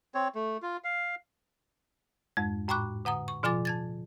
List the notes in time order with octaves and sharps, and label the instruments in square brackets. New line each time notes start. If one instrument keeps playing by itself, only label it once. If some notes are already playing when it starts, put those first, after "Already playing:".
[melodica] C4 C#5
A3
F4
F5
[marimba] F2 G#2 G#3
A2 G5 B5 C#6 D6 F#6
D3 F#5 A#5 D#6
C#6
B2 F3 F4 G#5 D6 A6
A5 G#6 A6